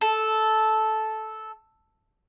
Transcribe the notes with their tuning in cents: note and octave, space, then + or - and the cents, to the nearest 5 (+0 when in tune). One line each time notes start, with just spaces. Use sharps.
A4 -10